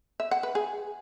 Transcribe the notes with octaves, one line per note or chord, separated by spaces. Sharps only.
E5
F#5
B4
G#4